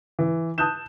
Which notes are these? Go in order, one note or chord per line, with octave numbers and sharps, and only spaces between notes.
E3
A5 D#6 F#6 G6 E7